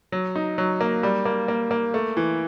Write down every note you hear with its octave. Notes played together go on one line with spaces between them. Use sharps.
F#3
D#4
F#3
A#3
G3
A#3
A#3
A#3
A3
E3